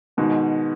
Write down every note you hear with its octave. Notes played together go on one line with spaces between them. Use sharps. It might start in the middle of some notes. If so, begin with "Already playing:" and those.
G#2 B2 D#3 G#3 B3 D#4 F#4